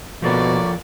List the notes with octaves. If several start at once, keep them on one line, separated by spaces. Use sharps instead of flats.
B2 F3 A#3 A4 B4 C#5 D5